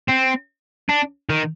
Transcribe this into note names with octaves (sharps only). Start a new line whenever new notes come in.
C4
D4
D#3